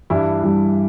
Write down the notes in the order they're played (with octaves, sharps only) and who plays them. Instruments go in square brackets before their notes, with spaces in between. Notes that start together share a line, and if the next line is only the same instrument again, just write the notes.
[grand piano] G2 E3 G3 D4 E4
G2 E3 G3 D4